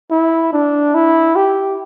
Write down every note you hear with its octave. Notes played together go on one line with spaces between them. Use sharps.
E4
D4
E4
G4